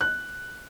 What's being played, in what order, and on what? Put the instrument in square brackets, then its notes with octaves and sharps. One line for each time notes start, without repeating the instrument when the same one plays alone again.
[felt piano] F#6